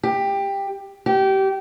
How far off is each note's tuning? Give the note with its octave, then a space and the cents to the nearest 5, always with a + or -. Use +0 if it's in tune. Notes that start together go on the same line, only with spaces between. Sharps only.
G4 +15
G4 -25